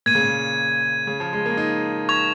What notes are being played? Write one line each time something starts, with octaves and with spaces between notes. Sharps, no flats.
A#2 G#6 D#7
C#3
A#2
C#3
F3
G#3
A#3
D#4
C#6 G#6 F7